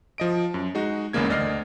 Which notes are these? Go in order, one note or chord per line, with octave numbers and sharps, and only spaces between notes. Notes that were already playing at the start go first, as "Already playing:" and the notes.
F3 D#5 D7
F#2
G#3 D#4 F#4
G1 E2 C#3 G#3 A#3 G#6
D2 D5 D#5 F6 C7